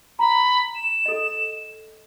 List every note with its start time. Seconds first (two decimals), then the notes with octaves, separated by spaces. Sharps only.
0.19 A#5 B5
0.75 E7
1.06 A4 D#5